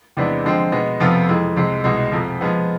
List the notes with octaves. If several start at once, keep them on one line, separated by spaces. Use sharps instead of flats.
E2 C3 G#3 B3 D4
D3 F3 G#3 C4
B2 G#3 B3
F2 C3 F3 B3 F4
F2 E3 G#3
C2 C3 G#3
C2 B2 G#3
F2 C3 F3
F3 G#3 B3